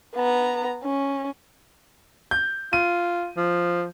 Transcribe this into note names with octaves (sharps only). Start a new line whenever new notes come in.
B3 A#5
C#4
G6
F4 D#7
F3